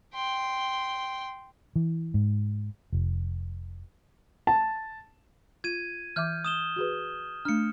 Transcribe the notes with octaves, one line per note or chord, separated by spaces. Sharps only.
G5 C6
E3
G#2
F1
A5
F4 G#6 D#7
E3 E5 D6 F6 G6
D#6 E7 G7
F#4 G#4 B4
A3 D4 F6 C#7